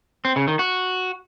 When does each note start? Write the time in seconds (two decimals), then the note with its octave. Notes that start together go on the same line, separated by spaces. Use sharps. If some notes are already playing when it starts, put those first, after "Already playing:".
0.25 C4
0.36 C#3
0.48 D#3
0.59 F#4